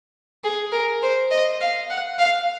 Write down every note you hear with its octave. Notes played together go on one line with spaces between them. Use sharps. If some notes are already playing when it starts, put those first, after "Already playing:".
G#4
A#4
C5
D#5
F5
F#5
F5